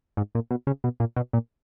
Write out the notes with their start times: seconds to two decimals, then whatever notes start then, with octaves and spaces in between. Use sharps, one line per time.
0.17 G#2
0.35 A#2
0.51 B2
0.67 C#3
0.84 B2
1.00 A#2
1.16 B2
1.33 A#2